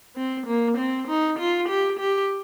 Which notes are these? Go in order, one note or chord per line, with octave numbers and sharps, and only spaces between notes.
C4
A#3
C4
D#4
F4
G4
G4